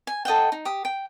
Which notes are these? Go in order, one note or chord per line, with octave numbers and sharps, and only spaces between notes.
G#5
A4 D#5 F#5 G5
D#4
G4 D#6
G5